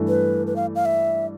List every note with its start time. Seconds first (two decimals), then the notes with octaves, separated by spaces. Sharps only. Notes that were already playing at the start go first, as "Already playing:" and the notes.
Already playing: G2 E3 A3
0.08 B4
0.47 B4
0.56 F5
0.75 F5
0.85 E5